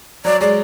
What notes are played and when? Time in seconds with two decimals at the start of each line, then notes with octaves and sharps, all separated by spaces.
0.25 F#3 D5
0.41 G#3 D5